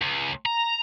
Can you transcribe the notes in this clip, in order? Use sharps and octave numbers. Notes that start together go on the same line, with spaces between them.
C#2
A#5